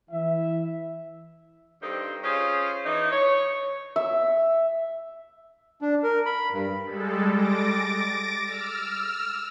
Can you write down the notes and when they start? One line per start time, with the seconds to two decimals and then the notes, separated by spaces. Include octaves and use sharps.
0.11 E3 E4 E5
1.82 G2 C4 D#4 A4 C5
2.24 C#4 F4 G#4 C5
2.85 E3 D#4
3.11 C#5
3.96 E5
5.81 D4
6.03 A#4
6.26 B5
6.53 G2
6.85 G3 G#3 A4
7.31 D6 A6 A#6 D7
8.44 E6 F6